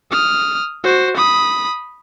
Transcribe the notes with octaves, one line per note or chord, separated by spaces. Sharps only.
D#6 F6
F#4 C5
B5 D#6